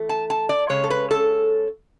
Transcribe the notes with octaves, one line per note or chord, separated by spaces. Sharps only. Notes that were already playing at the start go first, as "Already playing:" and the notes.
Already playing: E3 A3
A5
A5
D5
C#3 G#3 C#4 C#5
A4
B4
A4